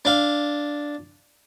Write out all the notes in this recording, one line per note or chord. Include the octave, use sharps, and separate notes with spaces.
D4 F5